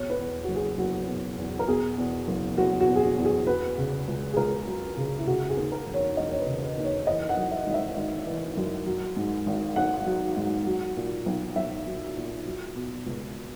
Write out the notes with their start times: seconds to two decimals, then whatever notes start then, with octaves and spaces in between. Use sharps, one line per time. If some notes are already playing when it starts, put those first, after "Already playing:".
Already playing: B2 C#5
0.10 B4
0.18 E2
0.44 F#1 F#4
0.56 G#4
0.77 F#1 F#4
1.08 B2
1.38 E2
1.59 A#4
1.68 B2 G#4
1.98 E2
2.28 F#1
2.57 F#1 F#4
2.80 F#4
2.87 B2
2.96 G#4
3.03 F#4
3.18 E2
3.25 G#4
3.47 F#3 B4
3.78 C#3
4.08 C#2
4.33 G#4
4.37 C#2 A#4
4.67 F#3
4.97 C#3
5.19 E4
5.27 C#3 F#4
5.49 G#4
5.57 D#2
5.72 A#4
5.86 E1
5.94 C#5
6.17 E1 D#5
6.31 C#5
6.40 B4
6.46 C#3
6.63 B4
6.77 D#2
6.84 C#5
7.07 E3 D#5
7.29 F#5
7.37 F#2
7.51 E5
7.67 G#1
7.74 E5
7.97 G#1
8.27 E3
8.57 F#2
8.86 F#3
9.17 G#2
9.46 G#1
9.76 G#1 F#5
10.06 F#3
10.37 G#2
10.66 F#3
10.97 A#2
11.26 B1
11.56 B1 E5
11.86 F#3
12.17 A#2
12.46 F#3
12.76 B2
13.06 C#2